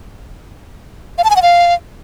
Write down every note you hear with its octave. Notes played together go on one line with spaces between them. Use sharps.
F5
A5
G#5
F#5
F5